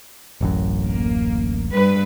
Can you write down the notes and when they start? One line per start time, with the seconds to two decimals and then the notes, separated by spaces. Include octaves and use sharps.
0.41 D1 A1 F#2
0.85 A#3
1.71 G2 G3 B4